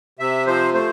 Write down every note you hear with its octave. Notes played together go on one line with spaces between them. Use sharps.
C3 E5
F3 C5
A3 C5